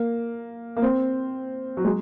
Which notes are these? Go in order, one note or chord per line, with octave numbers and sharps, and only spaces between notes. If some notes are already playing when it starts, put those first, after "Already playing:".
Already playing: A#3
A#3
C4
F#3
G#3